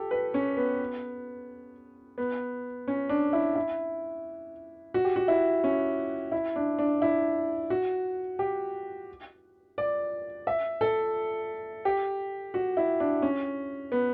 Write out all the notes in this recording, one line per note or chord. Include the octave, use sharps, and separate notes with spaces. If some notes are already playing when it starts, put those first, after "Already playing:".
Already playing: G4 A4
B4
C#4
B3
B3
C#4
D4
E4
E4
F#4
G4
F#4
E4
C#4
E4
D4
D4
E4
F#4
G4
D5
E5
A4
G4
F#4
E4
D4
C#4
B3